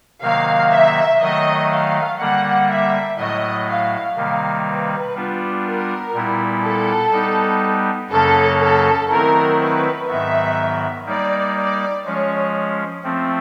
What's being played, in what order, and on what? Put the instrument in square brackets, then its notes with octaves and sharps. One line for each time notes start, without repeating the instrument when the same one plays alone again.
[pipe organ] C3 D#3 F#3 A#3 [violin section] F5
[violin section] E5
[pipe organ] D#3 F#3 A3 [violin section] D#5
[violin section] F5
[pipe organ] D3 G3 A#3 [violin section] F#5
[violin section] E5
[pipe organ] A2 F#3 A3 [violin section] D#5
[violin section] F5
[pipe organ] C3 D#3 G3 A#3 [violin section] F5
[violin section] B4
[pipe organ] G3 B3 D4 F4
[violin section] A#4
[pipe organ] A#2 G3 B3 E4
[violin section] A4
[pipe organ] G3 B3 D#4
[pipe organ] F#2 C#3 F#3 A#3 C#4 [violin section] A4
[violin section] A4
[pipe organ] D#3 F#3 A3 C4 E4 [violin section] A#4
[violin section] B4
[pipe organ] G#2 D#3 F#3 B3 [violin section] E5
[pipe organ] G3 A#3 D#4 [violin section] D5
[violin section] D5
[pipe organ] F3 G#3 C#4 [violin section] C#5
[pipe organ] F3 A3 C4